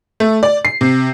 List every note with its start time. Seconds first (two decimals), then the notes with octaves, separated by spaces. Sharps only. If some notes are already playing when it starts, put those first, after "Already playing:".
0.20 A3
0.43 D5
0.65 C7
0.81 C3